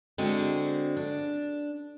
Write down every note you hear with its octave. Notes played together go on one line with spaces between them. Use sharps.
D3 G#3 C4 F#4
D4